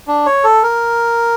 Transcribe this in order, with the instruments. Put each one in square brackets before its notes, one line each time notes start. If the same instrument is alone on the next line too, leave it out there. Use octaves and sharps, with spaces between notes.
[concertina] D4
C#5
A4
A#4